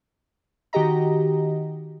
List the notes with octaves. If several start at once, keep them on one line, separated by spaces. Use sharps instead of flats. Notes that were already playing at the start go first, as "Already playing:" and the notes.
D#3 F#4 G4 D#5 A#5